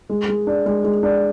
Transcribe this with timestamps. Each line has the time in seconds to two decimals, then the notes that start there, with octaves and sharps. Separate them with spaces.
0.09 G#3
0.29 G#3
0.47 D4
0.66 G#3
0.84 G#3
1.03 D4